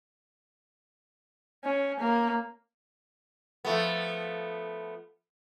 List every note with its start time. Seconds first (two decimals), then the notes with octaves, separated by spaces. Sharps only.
1.65 C#4
2.00 A#3
3.65 F3 A3 B3